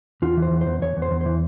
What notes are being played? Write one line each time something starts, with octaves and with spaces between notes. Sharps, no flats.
E2 F4
E3
C5
E2
C5
E2
E2 C#5
E2
C5
E2
E3 C5